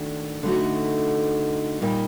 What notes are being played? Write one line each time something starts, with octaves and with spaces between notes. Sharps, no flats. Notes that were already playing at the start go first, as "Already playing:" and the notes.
Already playing: D#3 A3 D4 F#4
D3 A3 D#4 F#4
A#2 G3 A#3 D#4